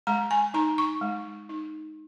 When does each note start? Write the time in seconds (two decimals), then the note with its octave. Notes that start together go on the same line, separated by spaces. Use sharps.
0.07 G#3 A#5
0.31 G#5
0.54 D#4 A#5
0.78 C#6
1.01 G#3
1.49 D#4